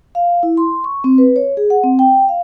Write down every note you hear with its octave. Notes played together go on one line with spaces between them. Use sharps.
F5
E4
C6
C#6
C4
B4
C#5
G#4
F#5
C4
G5
F5